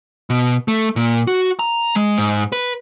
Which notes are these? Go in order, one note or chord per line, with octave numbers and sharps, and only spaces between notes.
B2
A3
A#2
F#4
A#5
G#3
G#2
B4